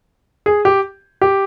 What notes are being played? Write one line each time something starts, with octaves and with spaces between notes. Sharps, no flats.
G#4
G4
G4